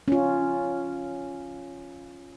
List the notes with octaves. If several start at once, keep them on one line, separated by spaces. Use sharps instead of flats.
C#4 F4